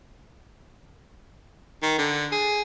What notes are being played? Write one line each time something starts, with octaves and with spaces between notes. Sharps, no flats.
D#3
D3
G#4